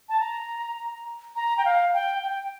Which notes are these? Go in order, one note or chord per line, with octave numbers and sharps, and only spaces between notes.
A5
A#5
A#5
G5
F5
G5
G5